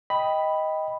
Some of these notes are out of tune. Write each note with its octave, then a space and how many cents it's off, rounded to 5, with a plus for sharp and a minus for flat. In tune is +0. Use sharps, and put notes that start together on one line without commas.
D#5 +10 G5 +0 B5 +0